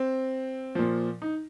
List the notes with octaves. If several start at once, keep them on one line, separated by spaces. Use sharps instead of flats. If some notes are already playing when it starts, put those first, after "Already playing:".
Already playing: C4
A#2 F3
D#4